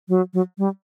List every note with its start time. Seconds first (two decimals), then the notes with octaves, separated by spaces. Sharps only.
0.09 F#3
0.34 F#3
0.58 G3